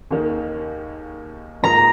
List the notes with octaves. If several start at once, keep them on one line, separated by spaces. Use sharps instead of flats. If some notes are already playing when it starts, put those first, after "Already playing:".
D#2 D#3 A#3 D#4 G#4
G#2 D#3 A#3 F4 G#4 A#5